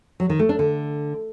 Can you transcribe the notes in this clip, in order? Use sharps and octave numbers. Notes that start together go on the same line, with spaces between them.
F#3
D#3
A3
D4
D3